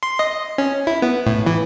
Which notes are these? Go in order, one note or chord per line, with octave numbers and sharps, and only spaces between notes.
C6
D#5
C#4
E4
B3
A2
E3